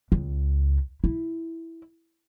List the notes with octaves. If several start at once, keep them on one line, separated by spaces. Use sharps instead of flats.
C#2
E4